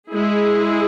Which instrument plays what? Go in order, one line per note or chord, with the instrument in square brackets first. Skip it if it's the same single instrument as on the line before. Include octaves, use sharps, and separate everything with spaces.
[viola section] G#3 E4 G#4